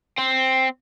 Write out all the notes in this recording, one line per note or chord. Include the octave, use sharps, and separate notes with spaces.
C4